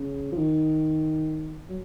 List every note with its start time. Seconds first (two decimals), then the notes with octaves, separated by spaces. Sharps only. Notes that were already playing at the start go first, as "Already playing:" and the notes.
Already playing: C#3
0.32 F3
0.37 D#3
1.69 F#3